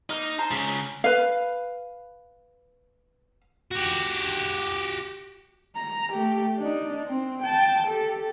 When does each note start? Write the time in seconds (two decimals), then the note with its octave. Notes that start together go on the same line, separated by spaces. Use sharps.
0.10 A#3 D#4 F6
0.38 C5 A5 A#5
0.52 C#3 G#3
1.04 B4 F5
3.71 F#4 G4
5.76 A#5
6.12 A3 G4
6.58 D4 D#4
7.07 C4
7.43 G5 A5
7.87 G4 A4